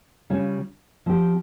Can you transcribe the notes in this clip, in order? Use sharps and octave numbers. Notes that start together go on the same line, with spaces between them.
C#3 G3 C#4 F4
F3 C4 G4